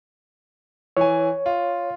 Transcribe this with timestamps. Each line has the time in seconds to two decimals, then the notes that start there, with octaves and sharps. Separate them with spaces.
0.97 E3 C#5 G#5
1.46 F4